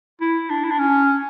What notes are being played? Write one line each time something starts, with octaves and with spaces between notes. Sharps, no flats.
E4
D4
E4
D4
C#4